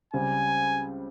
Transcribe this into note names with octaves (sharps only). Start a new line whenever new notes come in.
C#2 C#3 G3 C4 G#5